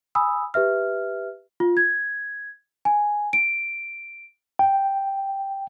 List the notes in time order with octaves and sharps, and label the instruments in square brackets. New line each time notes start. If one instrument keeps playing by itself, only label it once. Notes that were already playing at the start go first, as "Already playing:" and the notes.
[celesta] G#5 B5 D#6 E6
G4 B4 E5 F6
F4
G#6
G#5
D7
[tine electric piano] G5